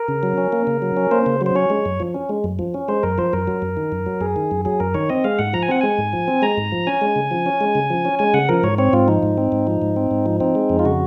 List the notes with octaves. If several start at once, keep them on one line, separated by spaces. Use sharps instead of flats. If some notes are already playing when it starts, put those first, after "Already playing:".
Already playing: A#4
C#3
F#3
C#4
A#3
C#3
F#3
C#4
A#3 C5
C#3
F#3
C5
C#4 C#5
G#3
F#2
F3
C#4
G#3
F#2
F3
C#4
G#3 C5
F#2 A#4
F3 C5
F#2 A#4
F#3
F#2
D#3
F#2
F#3
F#2 G#4
D#3
F#2
F#3 G#4
F#2 A#4
D#3 C#5
C4 D#5
G#3 F5
G#2 F#5
F3 A#5
G#5
C4 F#5
G#3 G#5
G#2
F3
C4
G#3 A#5
G#2
F3
C#4 G#5
G#3
C#3
F3
C#4
G#3
C#3
F3
C#4
G#3 G#5
C#3 F#5
F3 A#4
G#2 C#5
C4 C#5
G#2 F4
F3 D#4
G#2
C4
G#2
F3
G#2
C4
G#2
F3
C4 D#4
G#3
F2
F4
C#3 F#4